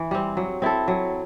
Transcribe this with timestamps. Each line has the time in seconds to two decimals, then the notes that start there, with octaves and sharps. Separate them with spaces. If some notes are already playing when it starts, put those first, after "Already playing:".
Already playing: E3
0.11 G3 C4
0.37 F#3
0.62 C4 E4 A4
0.88 F#3